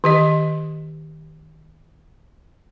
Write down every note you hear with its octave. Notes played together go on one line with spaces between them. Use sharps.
D#3 G4 D#5